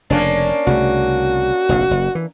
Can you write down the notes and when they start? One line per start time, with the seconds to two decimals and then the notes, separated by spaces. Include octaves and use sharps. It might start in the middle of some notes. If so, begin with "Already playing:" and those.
0.10 F1 C#3 A#3 C#4 D4
0.67 C2 C#3 A3 F#4
1.69 F1 A#1 G#2
1.91 F#1
2.15 E3